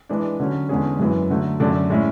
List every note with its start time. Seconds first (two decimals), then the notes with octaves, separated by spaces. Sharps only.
0.09 E3 G#3 D4
0.40 D3 F#3 C#4
0.69 E2 D3 G#3 C#4 G#4
1.00 F#2 E3 G#3
1.30 D3 F#3 A3
1.60 F#2 D3 A3 D4
1.90 A2 G#3 C#4 E4